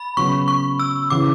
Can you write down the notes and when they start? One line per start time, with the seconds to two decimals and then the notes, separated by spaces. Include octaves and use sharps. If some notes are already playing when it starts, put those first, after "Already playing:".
Already playing: B5
0.17 C#3 F#3 B3 C#6
0.48 C#6
0.79 E6
1.10 C#3 E3 D6